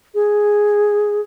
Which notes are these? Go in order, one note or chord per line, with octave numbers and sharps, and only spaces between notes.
G#4